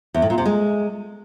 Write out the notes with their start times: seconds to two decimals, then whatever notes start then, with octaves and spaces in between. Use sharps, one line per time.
0.14 E2
0.22 A2
0.30 A#2
0.38 C3
0.45 G#3